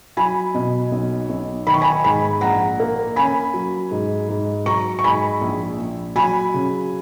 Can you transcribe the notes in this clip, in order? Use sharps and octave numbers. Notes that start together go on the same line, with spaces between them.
F#3 G#5 B5
B2
B1
B1
D#3 B5
C#6
G#5 B5
G#2 G#5 B5
A#1 F#5 A#5
A#3
C#4 G#5 B5
F#3
G#2
G#2
F#3 A#5 C#6
C#6
G#2 G#5 B5
A#1
A#1
F#3 G#5 B5
C#3